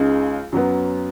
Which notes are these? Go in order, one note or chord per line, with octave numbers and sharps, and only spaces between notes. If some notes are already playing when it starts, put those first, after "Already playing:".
Already playing: C#2 C#3 G#3 D#4
F#2 F#3 B3